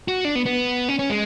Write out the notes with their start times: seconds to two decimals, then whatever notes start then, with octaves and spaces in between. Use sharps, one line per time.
0.08 F#4
0.25 D4
0.35 B3
0.46 B3
0.89 C#4
0.99 C#4
1.10 G#3